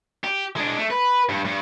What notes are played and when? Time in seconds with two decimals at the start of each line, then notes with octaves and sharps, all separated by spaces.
0.24 G4
0.57 G#3 D4
0.78 A3
0.90 B4
1.29 G2
1.45 G2